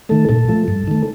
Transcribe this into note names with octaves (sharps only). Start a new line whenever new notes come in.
D#3 A3 A4
A#2 A4
F3 A3
G2
D#3 A3